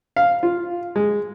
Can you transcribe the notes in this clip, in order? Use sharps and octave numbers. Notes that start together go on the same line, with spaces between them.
F5
F4
G#3